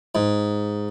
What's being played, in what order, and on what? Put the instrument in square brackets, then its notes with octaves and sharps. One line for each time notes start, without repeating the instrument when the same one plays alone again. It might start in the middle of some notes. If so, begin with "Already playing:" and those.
[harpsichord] G#2